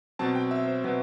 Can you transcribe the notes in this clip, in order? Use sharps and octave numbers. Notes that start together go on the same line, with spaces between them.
B2 F#3 C4 A5
G5
E5
C5
B2 F#3 C4 B4